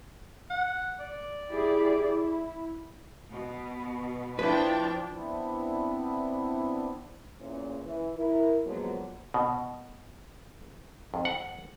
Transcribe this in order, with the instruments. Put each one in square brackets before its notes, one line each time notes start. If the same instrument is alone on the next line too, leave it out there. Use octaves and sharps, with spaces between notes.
[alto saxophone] F#5
D5
[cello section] E4 G4 G#4
E4
[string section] B2
[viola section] F3 D4 [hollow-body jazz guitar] E4 B4 [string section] G5 A5
[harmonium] B3 C4 D4 E4
[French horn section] E2 A#2 C#4
E3
E4 A#4
D3 F3 F#3 G#3 A#3 B3
[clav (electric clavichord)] B2
F2
F#5